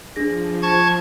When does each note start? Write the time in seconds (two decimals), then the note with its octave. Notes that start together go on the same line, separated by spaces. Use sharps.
0.16 F3 D4 G#4 A#6
0.62 A5 C#6 G#6